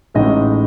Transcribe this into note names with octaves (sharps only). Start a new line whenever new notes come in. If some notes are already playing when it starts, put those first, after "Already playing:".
A1 A2 G#3 D#4 D#5